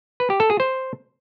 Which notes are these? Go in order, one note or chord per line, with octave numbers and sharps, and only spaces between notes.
B4
G4
A4
G#4
C5